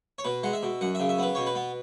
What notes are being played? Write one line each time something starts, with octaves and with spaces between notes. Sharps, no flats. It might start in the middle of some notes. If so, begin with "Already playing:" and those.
C#5
B2 B4
G#3 F#5
E5
B2
F#2 F#5
C#3 E5
E5
B3 B4
B2 C#5
B4
B3